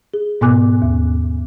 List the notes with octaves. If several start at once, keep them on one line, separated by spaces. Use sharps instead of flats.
G#4
G#2 B2 B3 G#5 D6 F#6
D#2